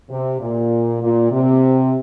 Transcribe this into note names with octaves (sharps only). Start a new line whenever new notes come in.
C3
A#2
A#2
C3